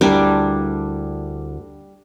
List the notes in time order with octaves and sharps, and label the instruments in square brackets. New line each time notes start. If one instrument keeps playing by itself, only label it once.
[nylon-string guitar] D2 E4 A#4 [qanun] G3 D4